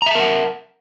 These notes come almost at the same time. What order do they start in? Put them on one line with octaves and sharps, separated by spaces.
A#5 E5 A5 A#4 F#5